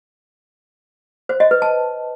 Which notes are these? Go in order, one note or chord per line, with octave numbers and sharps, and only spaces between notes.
C5
D#5
B4
A5